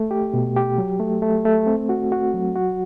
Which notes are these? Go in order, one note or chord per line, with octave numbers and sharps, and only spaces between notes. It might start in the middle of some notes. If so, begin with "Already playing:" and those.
Already playing: A3
G4
B2
G4
F#3
A3
A3
A3
C4
F#4
F#4
F#3
F#4